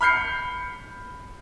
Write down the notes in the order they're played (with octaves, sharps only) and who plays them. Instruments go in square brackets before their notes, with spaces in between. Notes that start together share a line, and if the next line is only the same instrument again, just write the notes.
[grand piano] B5 F6 G6 C7 C#7